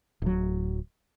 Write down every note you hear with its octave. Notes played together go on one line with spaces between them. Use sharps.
D1 F#3